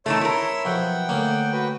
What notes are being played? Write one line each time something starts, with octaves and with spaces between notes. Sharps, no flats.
D#3 E3 A3 C#5 E5 A5 C6 E6
E4 A#4
B1 F3 F#5 G5
D2 A#3 C#4
F#4 B4 G5